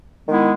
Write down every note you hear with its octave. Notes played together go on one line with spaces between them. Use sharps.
D#3 G#3 B3 E4